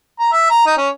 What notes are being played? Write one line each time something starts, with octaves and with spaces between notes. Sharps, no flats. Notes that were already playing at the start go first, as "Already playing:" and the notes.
A#5
E5
A#5
D#4
C#4